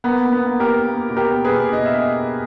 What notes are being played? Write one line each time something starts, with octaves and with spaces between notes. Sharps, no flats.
A#3 B3
A#3
B3
A#3
G4 A#4
A#3
A#3
B2
G4 A#4
A#3
G#4 B4
B2
B2 D#5
E5